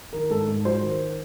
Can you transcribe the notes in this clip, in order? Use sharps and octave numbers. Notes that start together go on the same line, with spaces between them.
D#3 A#4
G#2 A4
G#2
F#3 C5
D#3